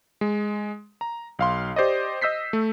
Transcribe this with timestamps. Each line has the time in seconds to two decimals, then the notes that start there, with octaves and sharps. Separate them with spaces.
0.21 G#3
1.01 A#5
1.39 B1 F5 C6
1.76 G4 C5 D5 D#5
2.21 D#5 E6 G6 B6 C7
2.53 A3